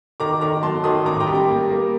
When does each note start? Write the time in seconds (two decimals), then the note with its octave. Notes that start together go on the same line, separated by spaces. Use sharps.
0.20 D#3 A#5 D6
0.41 D#3 A#5 D6
0.63 F#3 A5 C6
0.84 D#3 C6 D#6
1.05 A1 A#5 D6
1.20 G5 A#5
1.27 G3
1.35 A#5 D6
1.48 A#3
1.70 A#3